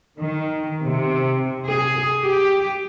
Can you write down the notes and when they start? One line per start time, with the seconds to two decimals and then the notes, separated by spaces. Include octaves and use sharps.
0.20 D#3
0.84 C3
1.67 G#4
2.23 G4